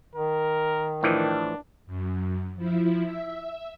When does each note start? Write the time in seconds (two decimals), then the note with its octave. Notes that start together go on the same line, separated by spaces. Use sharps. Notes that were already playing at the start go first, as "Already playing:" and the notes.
0.15 D#3 A#4
1.03 A2 E3 F3 D4
1.87 F#2
2.56 F3 E4
3.04 E5